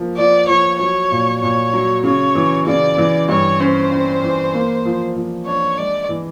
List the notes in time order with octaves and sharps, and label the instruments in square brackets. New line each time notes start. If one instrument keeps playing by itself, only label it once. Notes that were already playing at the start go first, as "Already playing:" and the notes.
Already playing: [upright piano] F3 A#3
[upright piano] F3 [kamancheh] D5
[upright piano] F3 [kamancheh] C#5
[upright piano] F#3 [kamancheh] C#5
[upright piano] A#2
[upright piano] A#2 [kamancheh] C#5
[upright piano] F#3
[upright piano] C#3 [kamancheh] C#5
[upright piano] E3
[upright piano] C#3 [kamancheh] D5
[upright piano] E3
[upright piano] G2 [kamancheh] C#5
[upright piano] C#4 [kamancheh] C5
[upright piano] C#4
E3
A#3
F3
F3
[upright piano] D4 [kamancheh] C#5
[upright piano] G#3 [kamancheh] D5
[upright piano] E3